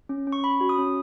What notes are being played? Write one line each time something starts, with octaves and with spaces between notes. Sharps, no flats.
C#4
C#4
C#6
C#4 B5
F#4
D#6
C#4